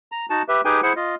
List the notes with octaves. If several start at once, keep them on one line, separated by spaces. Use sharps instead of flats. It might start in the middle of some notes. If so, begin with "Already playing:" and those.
A#5
D#4 F#4 A5
G4 B4 E5
D#4 G4 G#4 B4 G5 G#5
E4 G#4 C5 F#5
F4 D#5